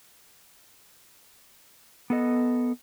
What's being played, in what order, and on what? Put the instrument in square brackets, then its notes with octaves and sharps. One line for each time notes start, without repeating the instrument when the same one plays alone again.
[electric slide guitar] B3 A4 D#5